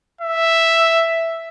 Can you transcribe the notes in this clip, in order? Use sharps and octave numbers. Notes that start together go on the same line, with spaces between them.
E5